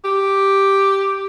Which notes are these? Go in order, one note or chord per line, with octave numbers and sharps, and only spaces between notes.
G4